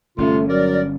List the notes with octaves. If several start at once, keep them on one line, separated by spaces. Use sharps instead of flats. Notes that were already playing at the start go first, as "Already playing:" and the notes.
G1 C3 A3 C#4 F4
F#3 A#4 D5